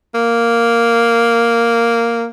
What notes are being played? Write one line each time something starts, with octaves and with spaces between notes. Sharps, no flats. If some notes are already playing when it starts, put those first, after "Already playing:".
A#3